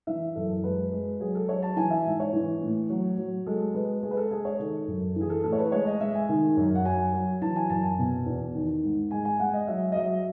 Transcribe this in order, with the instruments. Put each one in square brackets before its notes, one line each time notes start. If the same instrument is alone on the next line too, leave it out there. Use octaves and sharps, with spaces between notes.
[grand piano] E3 E5
F#2 A4
G#3 B4
G#3
F#3 G#4
A4
F#3 C#5
A5
E3 G#5
E5
G#2
C#5
E3
A2
F#3
F#3
G#3 A4
G#3 B4
G#3 G#4
B4
A4
G#3 G#4
C#5
D#3 A4
F#2
E3 G#4
A4
A2 A4
C#5
B4
G#3 C#5
D#5
G#3 E5
G#5
D#3
F#2
F#5
F#3 G#5
F#3
E3 A5
G#5
F#2 A5
G#5
B2
E2
D#3
G#2
G#3 G#5
G#5
G#3 F#5
D#5
F#3 E5
D#5
F#3 E5